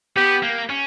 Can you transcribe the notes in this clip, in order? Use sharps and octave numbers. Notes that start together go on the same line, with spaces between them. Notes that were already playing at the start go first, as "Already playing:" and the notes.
B3 G4
A#3
C#4